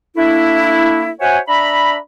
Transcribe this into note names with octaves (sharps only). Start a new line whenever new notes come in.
A3 A#3 D4 E4
F#4 C5 C#5 E5 F#5 G#5
D4 E5 A#5 B5